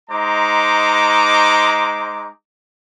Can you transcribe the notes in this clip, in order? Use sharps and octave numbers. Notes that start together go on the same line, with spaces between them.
G#3 D#4 C5 A#5 D6